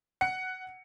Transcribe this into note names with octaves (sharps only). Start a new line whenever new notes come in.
F#5 C#7